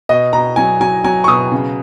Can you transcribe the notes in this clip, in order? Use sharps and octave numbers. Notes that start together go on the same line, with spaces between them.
B2 D#5
B2 A#5
F#3 G#5
F#3 G#5
F#3 G#5
C#6
B2 D#6
C#3